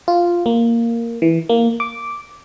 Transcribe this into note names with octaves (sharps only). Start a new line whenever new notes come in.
F4
A#3
E3
A#3
D6